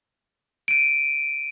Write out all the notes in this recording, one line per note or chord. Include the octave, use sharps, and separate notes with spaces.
D7 D#7